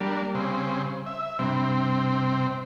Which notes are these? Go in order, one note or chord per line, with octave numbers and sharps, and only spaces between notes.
G3 A#3 D4
C#3 C4
E5
G2 C3 C4